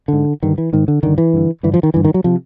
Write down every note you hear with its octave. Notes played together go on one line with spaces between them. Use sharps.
G#2 D3
G2 D3 D#3
E3
G#2 D#3
D3
G2 D3 D#3
E3
G2 D3
G2 D3 E3
F3
D#3
G2 D3 E3
D#3
F#3
C3 F3